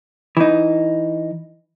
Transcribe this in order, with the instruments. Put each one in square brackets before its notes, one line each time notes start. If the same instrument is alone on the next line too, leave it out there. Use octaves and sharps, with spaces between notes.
[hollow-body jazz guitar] E3 D#4